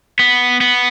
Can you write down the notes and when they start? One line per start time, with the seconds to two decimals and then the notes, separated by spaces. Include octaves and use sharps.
0.19 B3
0.61 B3